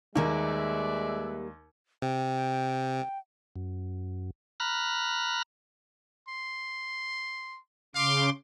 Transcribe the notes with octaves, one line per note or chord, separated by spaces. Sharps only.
D#2 G3 G#3 A#3 G4 B4 D5 E5
C3 G5
F#2
A#5 B5 F6 F#6
C6
C#3 F5 C6 D6